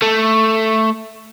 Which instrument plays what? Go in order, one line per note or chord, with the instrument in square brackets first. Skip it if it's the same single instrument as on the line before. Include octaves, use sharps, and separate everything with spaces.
[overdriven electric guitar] A3